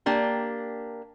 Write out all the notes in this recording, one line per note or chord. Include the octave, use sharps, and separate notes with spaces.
A#3 D4 G4